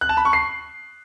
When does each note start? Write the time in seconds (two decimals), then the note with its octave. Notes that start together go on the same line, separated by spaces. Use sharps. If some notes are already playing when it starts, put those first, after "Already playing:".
0.01 F#6
0.09 A5
0.17 B5
0.25 C#6
0.33 C7